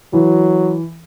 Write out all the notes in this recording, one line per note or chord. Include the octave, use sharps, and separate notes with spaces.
E3 F#3